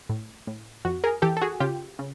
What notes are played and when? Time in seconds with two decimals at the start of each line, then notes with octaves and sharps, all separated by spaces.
0.09 A2
0.47 A2
0.85 F2 F#4
1.04 G#4 A#4
1.22 E3 G4 A4
1.37 A4
1.41 F#4 G#4
1.60 C#3 F4 G4
1.99 C#3